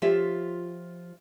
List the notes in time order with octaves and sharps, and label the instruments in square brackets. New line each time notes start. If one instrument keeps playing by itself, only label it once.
[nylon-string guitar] F3 F4 G4 C#5 E5